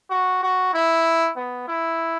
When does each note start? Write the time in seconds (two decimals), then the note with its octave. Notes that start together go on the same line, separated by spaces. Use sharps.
0.10 F#4
0.43 F#4
0.74 E4
1.37 B3
1.68 E4